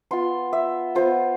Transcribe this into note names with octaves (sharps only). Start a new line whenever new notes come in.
B3 F4 C6
E5
B3 F4 C5